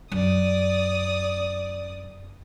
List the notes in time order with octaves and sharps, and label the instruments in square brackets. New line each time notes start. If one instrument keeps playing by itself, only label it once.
[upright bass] F#2 [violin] D5 D#6